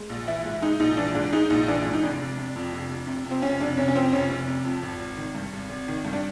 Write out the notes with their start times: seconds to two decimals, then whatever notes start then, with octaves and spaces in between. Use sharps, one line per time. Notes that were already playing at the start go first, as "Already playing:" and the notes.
Already playing: G#3
0.09 A#1
0.27 E3 E4
0.45 G#2
0.62 G#3 D#4
0.80 A#1 D#4
0.97 E3 D4
1.14 G#2 D4
1.33 G#3 D#4
1.50 A#1 D#4
1.68 E3 D4
1.85 G#2 D4
1.94 D#4
2.03 F1 D4
2.19 F1
2.37 C3
2.56 F2
2.72 F1
2.90 F1
3.07 C3
3.25 F2
3.31 C4
3.42 F1 C#4
3.60 F1 D4
3.77 C3 C#4
3.88 C#4
3.95 F2 C4
4.12 F1 C#4
4.30 F1
4.47 C3
4.65 F2
4.83 G#1
5.00 G#1
5.17 D#3
5.35 G2
5.52 G#1
5.70 G#1
5.88 D#3
6.05 G2
6.13 D4